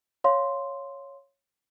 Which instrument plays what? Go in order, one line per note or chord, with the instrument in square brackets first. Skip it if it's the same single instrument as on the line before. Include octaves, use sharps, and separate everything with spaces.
[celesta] C#5 F5 C6